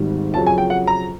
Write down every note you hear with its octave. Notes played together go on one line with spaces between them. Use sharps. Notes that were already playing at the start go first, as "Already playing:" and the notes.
Already playing: G#1 G#2 D#3 G3
F2 C#3 F#3 A5
G#5
G5
F#5
A#5